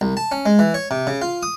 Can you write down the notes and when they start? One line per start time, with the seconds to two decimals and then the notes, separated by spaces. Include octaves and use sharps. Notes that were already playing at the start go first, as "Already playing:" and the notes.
0.01 C2
0.17 A5
0.32 C#4
0.46 G#3
0.59 E3
0.74 C#5
0.91 C3
1.07 C#3
1.22 F4
1.43 D#6